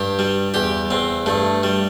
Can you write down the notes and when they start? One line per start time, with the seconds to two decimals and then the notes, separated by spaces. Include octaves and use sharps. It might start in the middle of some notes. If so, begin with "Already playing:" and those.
Already playing: G2 G4
0.19 G3
0.54 E2 G4
0.91 E2 C4
1.26 G2 A3
1.63 G3